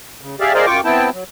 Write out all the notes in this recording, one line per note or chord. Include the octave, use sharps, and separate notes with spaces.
C#3
G4 G#4 D5 E5 F5
G#4 A#4 C5 D5 D#5 F5
F#2 F4 G5 C#6 D6
B3 C4 E4 G5 A5
F#3